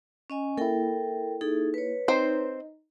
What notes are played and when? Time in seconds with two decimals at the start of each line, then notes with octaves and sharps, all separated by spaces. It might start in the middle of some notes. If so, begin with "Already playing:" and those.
0.30 C#4 D#5 G#5
0.58 A#3 E4 A4 A#4 G5
1.41 D#4 G#4 A4
1.74 B4 C#5
2.08 C4 D#4 C5